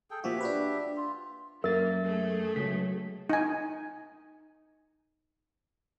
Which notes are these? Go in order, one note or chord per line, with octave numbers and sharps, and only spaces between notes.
G#4 A4 G5
A#2 F3 F#4 G4 E5
D4 F#4 B4
F4
F#2 A#3 A#4 E5 A6
A3 G#4
C#2 F#3 B6
D#4 G#5